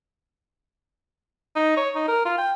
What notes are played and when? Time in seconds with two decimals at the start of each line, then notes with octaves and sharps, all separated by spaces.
1.55 D#4
1.76 C#5
1.95 D#4
2.08 A#4
2.25 F4
2.38 G5